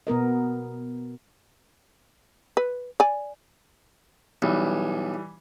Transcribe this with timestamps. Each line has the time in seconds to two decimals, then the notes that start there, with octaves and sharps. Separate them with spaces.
0.07 B2 B3 A#4 D#5
2.57 B4
3.00 D5 G#5
4.42 B1 E3 G3